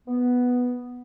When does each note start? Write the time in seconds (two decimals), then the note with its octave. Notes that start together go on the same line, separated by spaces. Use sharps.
0.08 B3